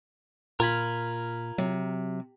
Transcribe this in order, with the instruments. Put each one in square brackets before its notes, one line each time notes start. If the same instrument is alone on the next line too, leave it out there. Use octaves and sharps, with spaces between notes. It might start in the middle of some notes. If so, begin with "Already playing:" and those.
[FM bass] A#2 [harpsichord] F4 G#5 B5 [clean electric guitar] A#4
[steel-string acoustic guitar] C3 [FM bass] F#3